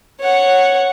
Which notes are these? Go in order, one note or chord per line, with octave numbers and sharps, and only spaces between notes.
C#5 F#5